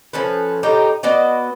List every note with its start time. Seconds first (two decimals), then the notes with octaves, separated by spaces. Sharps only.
0.13 F3 C#4 A4 B4
0.63 A2 D#4 G4 A#5
1.03 B3 F#4 D5 D#5